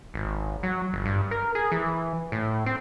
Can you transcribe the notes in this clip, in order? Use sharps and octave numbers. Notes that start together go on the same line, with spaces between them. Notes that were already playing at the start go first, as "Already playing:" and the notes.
G#1
F#3
G1
G2
A#4
G#4
E3
A2
C4